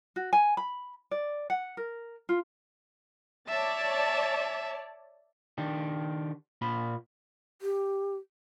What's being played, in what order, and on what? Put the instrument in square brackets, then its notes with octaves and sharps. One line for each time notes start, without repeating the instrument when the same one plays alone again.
[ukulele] F#4
G#5
B5
D5
F#5
A#4
F4
[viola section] C#5 D5 A5 [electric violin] E5
[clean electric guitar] D#3 D4 G4
A#2 F4 B5
[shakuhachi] G4